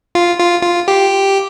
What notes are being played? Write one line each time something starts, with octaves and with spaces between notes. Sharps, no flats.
F4
F4
F4
G4